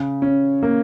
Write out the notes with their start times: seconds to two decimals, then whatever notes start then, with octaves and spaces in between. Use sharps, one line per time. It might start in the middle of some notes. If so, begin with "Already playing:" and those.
Already playing: C#3
0.22 C#4
0.63 A#3